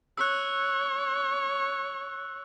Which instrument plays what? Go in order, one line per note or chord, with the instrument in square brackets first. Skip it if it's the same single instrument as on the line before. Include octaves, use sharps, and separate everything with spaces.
[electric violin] C#5 [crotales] E6 F#6